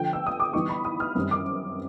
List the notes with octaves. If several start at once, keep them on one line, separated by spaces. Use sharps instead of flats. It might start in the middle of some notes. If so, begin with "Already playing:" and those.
Already playing: D3 F3 A3 D4 G5
E6
D#6
D6
E3 G3 B3 D#4 C#6
B5
D#6
F6
F#2 D#3 G3 C4
D6